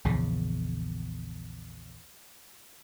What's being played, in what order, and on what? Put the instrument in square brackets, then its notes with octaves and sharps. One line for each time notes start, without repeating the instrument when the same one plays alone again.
[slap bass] A#1 E2 C#3